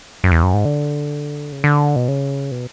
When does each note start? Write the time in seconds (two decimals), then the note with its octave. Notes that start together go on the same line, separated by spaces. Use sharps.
0.24 F#2
0.32 E2
0.43 F#2
0.54 G#2
0.65 D3
1.52 C#3
1.64 D3
1.96 B2
2.08 C#3
2.51 B2